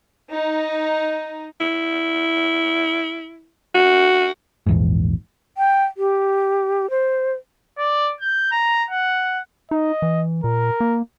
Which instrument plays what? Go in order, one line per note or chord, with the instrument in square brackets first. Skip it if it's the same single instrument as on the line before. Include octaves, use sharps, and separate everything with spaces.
[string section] D#4
[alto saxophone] E4
F#4
[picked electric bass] A#1 E2 G#2
[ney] G5
G4
C5
[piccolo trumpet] D5
G6
A#5
F#5
[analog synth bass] D#4 [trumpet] D#5
[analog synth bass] E3
[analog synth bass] A#2 [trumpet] A#4
[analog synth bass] A#3